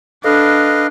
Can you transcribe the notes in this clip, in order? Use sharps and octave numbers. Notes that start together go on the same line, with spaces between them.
D4 A4 B4 D#5 F5